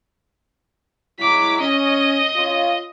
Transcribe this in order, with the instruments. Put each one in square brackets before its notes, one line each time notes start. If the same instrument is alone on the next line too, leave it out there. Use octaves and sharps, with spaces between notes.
[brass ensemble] F#3 G#3 E4 [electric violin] D6 B6
[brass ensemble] C#4 [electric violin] D#5
[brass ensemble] C#4 F4